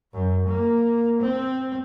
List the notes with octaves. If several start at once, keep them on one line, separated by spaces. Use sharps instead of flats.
F#2
A#3
C4